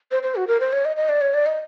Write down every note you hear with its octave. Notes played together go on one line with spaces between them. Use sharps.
C5
C5
F#4
A#4
C5
C#5
D#5
D#5
D5
C#5
D5
D#5